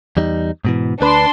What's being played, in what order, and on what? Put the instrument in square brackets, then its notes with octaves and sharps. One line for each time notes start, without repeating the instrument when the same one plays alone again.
[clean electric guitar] E2 G3 D#4
G#2 B2 E3
[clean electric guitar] D2 B4 B5 [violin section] D4 C6